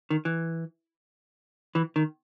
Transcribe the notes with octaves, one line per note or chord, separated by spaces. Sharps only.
D#3
E3
E3
D#3